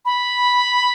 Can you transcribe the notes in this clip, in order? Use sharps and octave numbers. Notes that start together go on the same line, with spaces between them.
B5